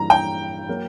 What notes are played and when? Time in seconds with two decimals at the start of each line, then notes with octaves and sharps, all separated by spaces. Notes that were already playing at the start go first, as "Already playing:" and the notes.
Already playing: G2 E3 G3 A#3 A#5
0.10 G5
0.69 F#3 A#3